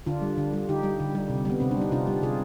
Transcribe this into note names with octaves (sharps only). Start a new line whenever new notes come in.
D3 D4 F4
G3
D3
G3
D3 D#4 G4
G3
D3
G3
C3
G3 B3
C3 C4
D4
G3 D#4
C3 D4 F4
G3
C3 F4 G#4